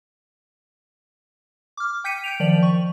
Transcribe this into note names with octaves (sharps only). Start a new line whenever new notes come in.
D6 F6
G5 G6 B6 C#7 D#7
G6 D7 F7
D#3 F3 D5 F#7
C#6